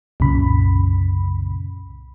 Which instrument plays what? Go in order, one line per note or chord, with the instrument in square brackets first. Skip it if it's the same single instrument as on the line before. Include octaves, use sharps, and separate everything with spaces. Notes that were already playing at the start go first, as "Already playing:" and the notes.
[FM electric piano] C2 F#2 A#2 C#3 B5